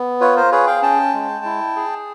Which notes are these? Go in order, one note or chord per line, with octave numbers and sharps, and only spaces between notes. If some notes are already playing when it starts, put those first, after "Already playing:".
Already playing: B3
F4 B4 C#5
A#4 C5
G#4 B4 C#5
F5 G5
C#4 G5 A5
G#3
E4
G#4